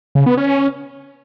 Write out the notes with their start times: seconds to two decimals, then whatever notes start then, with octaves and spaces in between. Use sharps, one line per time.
0.15 C#3
0.26 B3
0.37 C#4